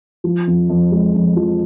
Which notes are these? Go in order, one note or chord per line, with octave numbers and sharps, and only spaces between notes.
F3
F2
F2
G#3
F2
F3